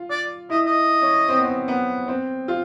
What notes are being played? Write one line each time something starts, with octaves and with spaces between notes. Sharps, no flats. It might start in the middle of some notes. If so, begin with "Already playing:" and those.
Already playing: F4
D5
E4 D#5
D#5
C#4
C4
B3
C4
B3
C4
F4